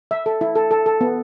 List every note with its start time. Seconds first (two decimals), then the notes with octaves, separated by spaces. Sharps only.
0.11 E5
0.26 A4
0.41 E4
0.55 A4
0.71 A4
0.86 A4
1.01 B3